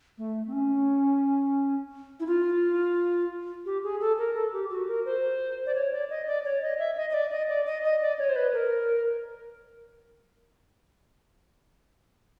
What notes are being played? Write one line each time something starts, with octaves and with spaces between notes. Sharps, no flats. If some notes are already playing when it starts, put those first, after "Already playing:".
A3
C4
C#4
E4
F4
G4
G#4
A4
A#4
A4
G4
F#4
A#4
C5
D5
C#5
D5
D#5
D5
C#5
D#5
E5
D#5
D#5
D5
D#5
D5
D#5
D#5
D5
C#5
C5
B4
A#4